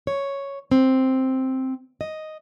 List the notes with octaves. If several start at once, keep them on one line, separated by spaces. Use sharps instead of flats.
C#5
C4
D#5